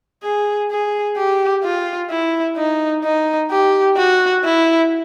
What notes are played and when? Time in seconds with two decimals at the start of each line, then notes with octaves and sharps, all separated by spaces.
0.23 G#4
0.71 G#4
1.17 G4
1.63 F4
2.10 E4
2.57 D#4
3.04 D#4
3.50 G4
3.97 F#4
4.44 E4